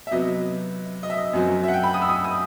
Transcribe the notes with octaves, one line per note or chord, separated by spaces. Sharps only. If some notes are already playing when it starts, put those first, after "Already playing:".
E5
C3 F#3 B3 D#5
D#5
E5
D#5
F#2 F#3 C4
E5
F#5
G5
B5
D#6
E6
D#6
D#6